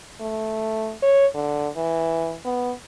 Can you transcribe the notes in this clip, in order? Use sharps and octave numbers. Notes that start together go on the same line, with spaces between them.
A3
C#5
D3
E3
B3